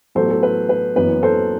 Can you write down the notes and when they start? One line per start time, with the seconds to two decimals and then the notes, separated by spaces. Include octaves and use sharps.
0.15 A1 A2 F#3 B3 A4 C5
0.31 A4
0.43 B4
0.69 B4
0.96 F#1 F#2 E3 B3 B4
1.23 A4 C5